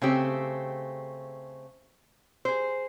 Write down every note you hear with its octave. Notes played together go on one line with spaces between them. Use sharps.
C#3 A3 C4 G4
G#4 C5